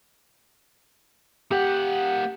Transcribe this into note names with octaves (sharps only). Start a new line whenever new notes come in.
A#3 G4 F#5